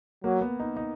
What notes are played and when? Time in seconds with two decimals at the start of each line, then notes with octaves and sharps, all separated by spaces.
0.24 F#3 A#3
0.41 B3
0.60 D#4
0.77 D#4